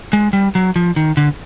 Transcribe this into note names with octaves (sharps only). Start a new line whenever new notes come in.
G#3
G3
F#3
F3
D#3
D3